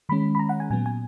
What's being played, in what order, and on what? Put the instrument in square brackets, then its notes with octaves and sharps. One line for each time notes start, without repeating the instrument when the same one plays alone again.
[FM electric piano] D#3 G#3 C#4 B5
B5
A#5
F#5
G#5
A#2 F#3 B3 G#5
G#5